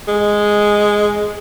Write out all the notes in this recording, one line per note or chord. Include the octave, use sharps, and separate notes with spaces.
G#3